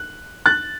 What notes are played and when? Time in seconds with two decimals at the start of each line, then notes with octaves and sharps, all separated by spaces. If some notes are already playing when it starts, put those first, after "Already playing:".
Already playing: F#6
0.46 F#6 A6